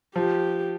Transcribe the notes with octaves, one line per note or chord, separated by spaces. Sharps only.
F3 G4